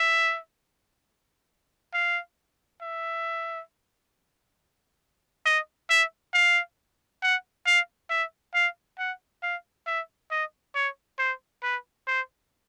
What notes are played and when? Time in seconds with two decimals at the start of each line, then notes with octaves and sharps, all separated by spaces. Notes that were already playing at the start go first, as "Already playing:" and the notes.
Already playing: E5
1.93 F5
2.82 E5
5.45 D#5
5.90 E5
6.34 F5
7.22 F#5
7.66 F5
8.10 E5
8.54 F5
8.98 F#5
9.43 F5
9.87 E5
10.31 D#5
10.75 C#5
11.19 C5
11.63 B4
12.07 C5